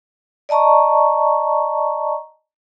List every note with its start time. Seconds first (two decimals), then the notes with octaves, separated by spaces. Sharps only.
0.49 D5 D#5 A5 A#5 C#6